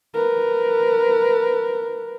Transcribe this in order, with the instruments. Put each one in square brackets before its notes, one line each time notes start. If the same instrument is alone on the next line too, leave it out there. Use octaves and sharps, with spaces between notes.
[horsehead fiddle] A#4 B4